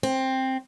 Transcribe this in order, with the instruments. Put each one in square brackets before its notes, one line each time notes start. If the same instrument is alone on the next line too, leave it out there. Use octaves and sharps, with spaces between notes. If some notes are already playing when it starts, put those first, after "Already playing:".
[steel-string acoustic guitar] C4